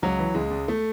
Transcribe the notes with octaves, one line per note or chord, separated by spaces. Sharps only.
C#2 F#3
E3
C#2 G#3
C#2
A3